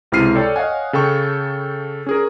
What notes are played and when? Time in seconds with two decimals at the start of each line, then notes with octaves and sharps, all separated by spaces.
0.12 C#2 C3 E4 F6 C7 D#7
0.35 A4 C#5 D5 G5
0.56 C#5 D#5 F5 F#5 G#5
0.93 C#3 A4 G5 C#6
2.06 C#4 G#4 A#4